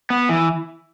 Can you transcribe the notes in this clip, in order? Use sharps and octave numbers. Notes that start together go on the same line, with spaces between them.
B3
E3